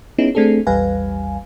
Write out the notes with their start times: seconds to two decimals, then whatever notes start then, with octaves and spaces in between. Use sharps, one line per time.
0.18 B3 C#4 D#4 E4 G#4
0.35 A3 C4 D4 G#4 A4
0.67 A#1 E2 G3 B4 F5 G#5